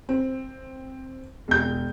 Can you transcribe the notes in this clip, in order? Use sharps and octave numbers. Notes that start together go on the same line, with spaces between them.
C4
E1 G6